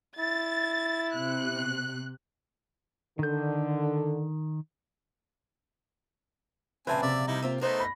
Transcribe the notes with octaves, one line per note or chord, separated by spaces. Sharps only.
E4 A6
C3 F#6
D3 D#3 G6
A#2 C#3 F3 C4 B4 E5 G#5 A5
C3 D5 E5
G3 D#4 E4
A#3 C4 F4 E5
A3 B3 D#4 A#4 C5
B5 A#6